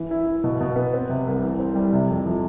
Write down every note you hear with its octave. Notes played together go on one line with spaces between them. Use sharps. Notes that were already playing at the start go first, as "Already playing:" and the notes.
Already playing: E3
E4
E4
B2
B2
B3
C4
C3
C2
E3
C4
G3
C3
F2
F3